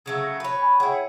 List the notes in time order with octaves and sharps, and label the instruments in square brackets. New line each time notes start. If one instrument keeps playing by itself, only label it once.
[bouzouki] C#3 F#3 A3
[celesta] A#6 C#7
[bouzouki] B4 C#5
[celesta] G#5 B5
[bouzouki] E4 G#4 [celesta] C#5 F#5 G5
[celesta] C#7